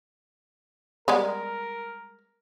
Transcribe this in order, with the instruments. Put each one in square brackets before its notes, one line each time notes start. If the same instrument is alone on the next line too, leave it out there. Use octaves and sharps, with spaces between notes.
[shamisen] G3 G#3 B3 [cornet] A#4